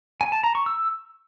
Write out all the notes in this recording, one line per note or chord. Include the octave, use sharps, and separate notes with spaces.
G#5
A5
A#5
C#6
E6